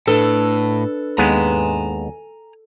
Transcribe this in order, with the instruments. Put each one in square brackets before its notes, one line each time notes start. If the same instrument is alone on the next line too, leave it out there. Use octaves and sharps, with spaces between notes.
[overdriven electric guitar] A2 [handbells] D4 B4 [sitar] A4
[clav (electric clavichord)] D#2 G#3 B3 [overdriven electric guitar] G#5 A#5